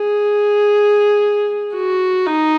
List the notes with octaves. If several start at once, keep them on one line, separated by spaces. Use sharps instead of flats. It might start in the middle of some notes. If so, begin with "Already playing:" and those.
Already playing: G#4
F#4
D#4